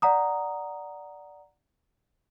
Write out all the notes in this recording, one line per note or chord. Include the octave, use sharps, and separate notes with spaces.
D5 F#5 A#5 D#6